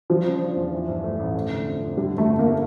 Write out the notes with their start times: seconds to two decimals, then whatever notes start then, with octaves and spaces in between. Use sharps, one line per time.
0.10 F3 G3
0.26 C#3
0.40 D4
0.56 E2
0.73 E3
0.88 G2
1.04 A3
1.20 A1
1.35 A3
1.50 D3
1.66 F2
1.82 F2
1.97 D3 G3
2.13 G2
2.18 A3
2.28 G1
2.39 A#3